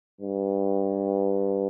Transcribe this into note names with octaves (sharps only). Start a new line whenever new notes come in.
G2